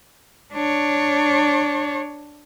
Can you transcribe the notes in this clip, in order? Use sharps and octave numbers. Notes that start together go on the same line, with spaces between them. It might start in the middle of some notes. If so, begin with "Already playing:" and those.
D4 C#5